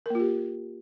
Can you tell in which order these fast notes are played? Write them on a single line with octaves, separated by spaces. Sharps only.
A#4 A#3 F4 G4